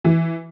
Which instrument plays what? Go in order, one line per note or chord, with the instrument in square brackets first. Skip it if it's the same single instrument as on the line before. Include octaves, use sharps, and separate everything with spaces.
[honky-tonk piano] E3